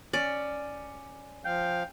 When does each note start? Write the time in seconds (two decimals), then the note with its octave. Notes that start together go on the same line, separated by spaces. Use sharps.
0.13 C#4 D5
1.45 F3 F5 G5